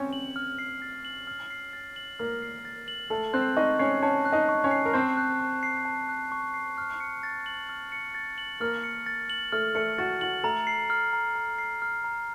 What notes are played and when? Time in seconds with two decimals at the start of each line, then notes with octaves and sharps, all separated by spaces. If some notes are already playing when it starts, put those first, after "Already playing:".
Already playing: C4 C#4 C#5
0.13 F#7
0.36 F6
0.59 C7
0.82 A6
1.05 F#7
1.27 F6
1.50 C7
1.73 A6
1.96 F#7
2.19 A#3 A#4 F6
2.42 C7
2.65 A6
2.88 F#7
3.10 A3 A4 A5
3.33 C4 C5 F#6
3.56 D#4 D#5 C#6
3.79 C#4 C#5 C7
4.02 C#4 C#5 A5
4.25 F#6
4.32 D#4 D#5
4.49 C#6
4.64 C#4 C#5
4.71 C7
4.85 A#4
4.94 C4 C5 A5
5.17 F#6
5.40 C#6
5.63 C7
5.85 A5
6.09 F#6
6.32 C#6
6.54 C7
6.78 F6
7.00 C#7
7.23 A6
7.46 F#7
7.69 F6
7.92 C#7
8.15 A6
8.38 F#7
8.60 A#3 A#4 F6
8.84 C#7
9.06 A6
9.30 F#7
9.52 A3 A4 F6
9.75 A3 A4 C#7
9.98 F#4 A6
10.21 F#4 F#7
10.44 A3 A4 A#5
10.67 C7
10.90 F6
11.13 A#5
11.36 A#5
11.58 C7
11.82 F6
12.04 A#5